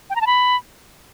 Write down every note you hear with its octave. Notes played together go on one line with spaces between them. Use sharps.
G5
A#5
A5
B5